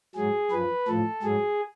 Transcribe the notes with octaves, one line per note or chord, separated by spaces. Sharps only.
G#2 F#3 G#4
F#2 F3 B4
A2 F3 A4
G#2 F#3 G#4